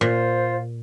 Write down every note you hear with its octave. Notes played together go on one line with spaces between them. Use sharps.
A#2 F4 C5